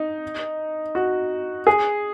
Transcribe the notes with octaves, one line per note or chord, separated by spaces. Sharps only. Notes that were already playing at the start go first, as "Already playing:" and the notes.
Already playing: D#4
F#4
G#4